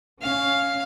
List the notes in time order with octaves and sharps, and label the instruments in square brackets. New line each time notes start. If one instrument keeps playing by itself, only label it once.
[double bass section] C#4 [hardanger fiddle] F5